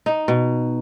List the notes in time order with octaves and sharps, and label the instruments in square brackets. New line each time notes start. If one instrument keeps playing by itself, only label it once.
[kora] D#4
B2